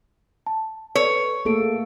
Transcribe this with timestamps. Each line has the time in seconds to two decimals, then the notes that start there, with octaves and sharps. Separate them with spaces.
0.46 A5
0.95 A4 B4 C#5
1.45 A3 A#3 G#4 A4 D7